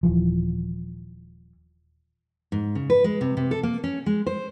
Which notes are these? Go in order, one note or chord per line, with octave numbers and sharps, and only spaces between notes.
D#1 E3 F3
G#2
C#3
B4
G#3
C3
C3
A4
A#3
C#4
G#3
C5